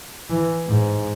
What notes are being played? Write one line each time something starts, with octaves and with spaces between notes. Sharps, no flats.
E3
G#2